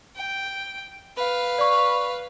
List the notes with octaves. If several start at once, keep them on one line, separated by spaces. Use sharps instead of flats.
G5
B4 F5
D5 C#6